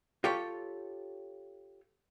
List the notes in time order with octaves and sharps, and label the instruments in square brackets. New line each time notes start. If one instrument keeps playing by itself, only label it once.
[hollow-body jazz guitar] F4 G4 A4 C#5